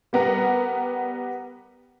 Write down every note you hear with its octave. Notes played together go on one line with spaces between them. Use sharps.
G3 B3 A#4 F#5